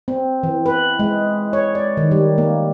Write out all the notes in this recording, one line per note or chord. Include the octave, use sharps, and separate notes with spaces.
C4
E3
B4
G#3
C#5
D5
D#3
G3
A#3